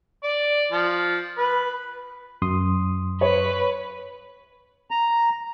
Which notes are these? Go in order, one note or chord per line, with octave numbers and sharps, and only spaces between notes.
D5
F3
B4
F#2 C6 D#6
B4 C#5
A#5